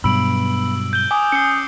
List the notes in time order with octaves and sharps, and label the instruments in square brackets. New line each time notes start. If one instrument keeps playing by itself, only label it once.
[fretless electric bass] G2 B2 F#3 [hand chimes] B3 B5 [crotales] E6 D7 F#7
[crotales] G6 G7
[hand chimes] G#5 [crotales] D6 D#6
[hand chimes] C#4 D#6 C7 [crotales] C#7 G7